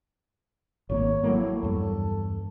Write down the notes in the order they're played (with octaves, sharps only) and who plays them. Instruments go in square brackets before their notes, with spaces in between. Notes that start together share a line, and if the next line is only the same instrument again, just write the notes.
[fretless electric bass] G#1 D#3 A#3 [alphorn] C#5
[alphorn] A2 [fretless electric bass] F#3 G3 A#3
[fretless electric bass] E2 G2 [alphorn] A4